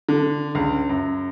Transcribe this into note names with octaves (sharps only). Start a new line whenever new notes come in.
D3
C#2
F#2